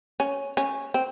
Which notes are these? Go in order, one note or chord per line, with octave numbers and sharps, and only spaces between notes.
C#4
C#4
C4